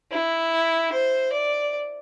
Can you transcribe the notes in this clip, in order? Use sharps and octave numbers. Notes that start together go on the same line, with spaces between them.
E4
C5
D5